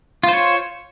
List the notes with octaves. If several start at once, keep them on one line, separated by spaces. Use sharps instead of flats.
F4 C5 C#5